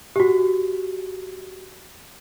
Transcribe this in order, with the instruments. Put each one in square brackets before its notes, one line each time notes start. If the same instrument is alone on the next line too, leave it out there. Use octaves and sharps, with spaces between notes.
[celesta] F#4 G4